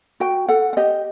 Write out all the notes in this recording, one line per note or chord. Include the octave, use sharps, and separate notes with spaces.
F#4 G5
A4 F#5
F#5
G4 D#5